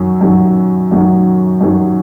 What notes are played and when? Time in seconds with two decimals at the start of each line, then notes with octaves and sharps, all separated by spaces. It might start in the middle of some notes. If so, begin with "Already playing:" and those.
Already playing: F#2 D#3 F#3
0.21 F#2 D#3 F#3
0.91 F#2 D#3 F#3
1.61 F#2 D#3 F#3